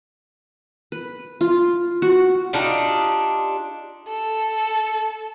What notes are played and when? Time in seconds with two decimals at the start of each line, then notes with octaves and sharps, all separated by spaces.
0.92 B4
1.41 F4
2.02 F#4
2.53 D4 D#4 F4 G4
4.08 A4